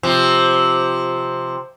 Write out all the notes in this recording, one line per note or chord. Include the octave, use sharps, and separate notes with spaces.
C3 F3